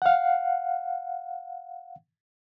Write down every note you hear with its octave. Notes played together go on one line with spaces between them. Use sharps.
F5 F#5